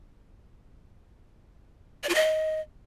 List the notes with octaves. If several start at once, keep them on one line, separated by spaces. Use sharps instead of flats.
D5
F4
D#5